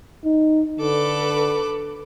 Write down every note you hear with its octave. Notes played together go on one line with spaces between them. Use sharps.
D#4
D3 A4 B4 D6